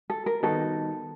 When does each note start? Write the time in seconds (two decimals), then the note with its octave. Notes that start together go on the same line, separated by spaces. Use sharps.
0.10 A4
0.26 A#4
0.43 D#3 G3 B3 D#4 F#4 A4